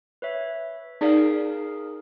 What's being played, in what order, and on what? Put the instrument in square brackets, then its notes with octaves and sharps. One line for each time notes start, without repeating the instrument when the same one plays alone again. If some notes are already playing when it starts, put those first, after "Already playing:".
[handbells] B4 C#5 E5
[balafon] D#4 D5 [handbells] G#4 A#4 F5